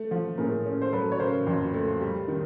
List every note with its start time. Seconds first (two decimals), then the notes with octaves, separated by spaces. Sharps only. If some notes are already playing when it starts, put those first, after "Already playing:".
Already playing: A3
0.11 F3
0.38 A2 G#4 A#4
0.65 C#4
0.82 C5
0.93 F#3 A4 B4
1.12 C#5
1.19 C#3 A#4 C5
1.47 F2
1.74 A3
2.01 G3
2.28 D#3